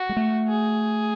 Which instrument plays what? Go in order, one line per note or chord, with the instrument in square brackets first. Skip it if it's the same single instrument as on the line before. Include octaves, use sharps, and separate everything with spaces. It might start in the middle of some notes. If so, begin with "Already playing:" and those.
Already playing: [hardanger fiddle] F#4
[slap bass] G#3
A3
[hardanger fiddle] G#4